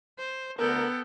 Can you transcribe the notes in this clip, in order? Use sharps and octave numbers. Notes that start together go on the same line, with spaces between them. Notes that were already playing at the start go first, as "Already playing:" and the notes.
C5
D2 D3 B3 A4 A#4 G5